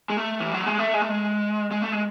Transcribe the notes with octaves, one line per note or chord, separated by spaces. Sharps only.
G#3
A3
E3
F#3
G#3
A3
G#3
A3
G#3
G#3
A3
G#3